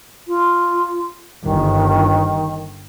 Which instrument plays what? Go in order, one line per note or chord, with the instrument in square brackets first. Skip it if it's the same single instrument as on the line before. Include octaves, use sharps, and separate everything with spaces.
[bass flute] F4
[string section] G1 [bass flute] D#3